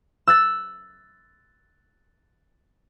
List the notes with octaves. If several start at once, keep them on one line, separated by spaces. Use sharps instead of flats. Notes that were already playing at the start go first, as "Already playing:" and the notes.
E6 F#6 A6